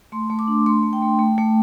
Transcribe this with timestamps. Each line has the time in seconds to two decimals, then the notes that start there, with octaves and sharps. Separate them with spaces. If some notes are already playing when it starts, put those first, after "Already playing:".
0.12 A3 C6
0.30 A3
0.39 D6
0.47 D4
0.66 A3 C6
0.83 A3
0.93 G5
1.02 A3
1.19 A3
1.38 A3